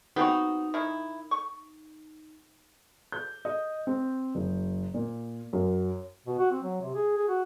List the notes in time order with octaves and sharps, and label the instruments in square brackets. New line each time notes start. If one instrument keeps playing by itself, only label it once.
[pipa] B3 C4 F#4 [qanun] D#4
[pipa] D#3 E4
C#6
[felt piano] G6
D#5
C4
F#1
A#2
F#2
[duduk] B2
F#4
C4
F#3
C3
G#4
G#4
F#4